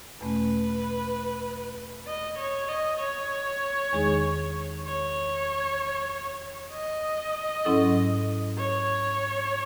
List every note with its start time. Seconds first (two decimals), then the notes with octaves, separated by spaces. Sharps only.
0.21 E2 B2 A3 C#4 B4
2.07 D#5
2.38 C#5
2.68 D#5
2.99 C#5
3.93 E2 D#3 G#3 D#4 G#4
4.86 C#5
6.71 D#5
7.65 G#2 F#3 C#4 E4 A4
8.58 C#5